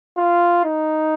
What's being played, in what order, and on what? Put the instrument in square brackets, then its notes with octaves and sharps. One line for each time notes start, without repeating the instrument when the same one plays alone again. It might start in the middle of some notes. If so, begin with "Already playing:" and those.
[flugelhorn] F4
D#4